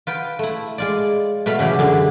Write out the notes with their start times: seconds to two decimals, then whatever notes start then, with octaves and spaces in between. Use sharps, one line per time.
0.07 F4 B4 G5
0.39 A3 E4
0.78 G#3 F4 D5
1.46 B2 A3 F5 B5 C6
1.59 C#3 E3 F#3 G4
1.79 F#2 D3 G#4 C6